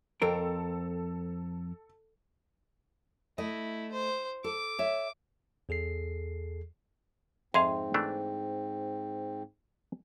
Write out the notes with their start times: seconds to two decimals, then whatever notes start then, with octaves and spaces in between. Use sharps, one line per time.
0.22 F2 C4 A4 A#4
3.38 A3 E4 D#5
3.92 C5
4.44 A4 D6
4.79 C#5 E5
5.69 E2 G#4 A4 C7
7.54 F2 G#2 C4 G#4 E5 F5 C6
7.94 E3 A3 D4